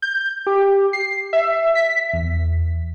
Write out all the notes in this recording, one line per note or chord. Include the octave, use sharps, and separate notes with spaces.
G6
G4
C7
E5
B6
E2